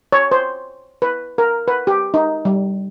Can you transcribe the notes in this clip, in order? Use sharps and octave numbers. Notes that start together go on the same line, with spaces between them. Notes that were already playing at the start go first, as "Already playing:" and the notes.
C#5
C5
B4
A#4
B4
G4
D#4
G3